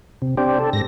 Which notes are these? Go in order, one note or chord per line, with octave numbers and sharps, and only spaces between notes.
C3
C4 D4 G4
A4
G#2 A#6